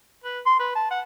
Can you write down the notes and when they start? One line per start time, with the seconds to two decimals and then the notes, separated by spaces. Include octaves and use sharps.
0.25 B4
0.46 C6
0.59 B4
0.75 A5
0.91 F#5